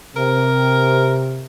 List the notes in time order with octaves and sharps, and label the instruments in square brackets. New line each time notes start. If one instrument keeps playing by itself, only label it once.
[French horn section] C3 [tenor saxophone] A#4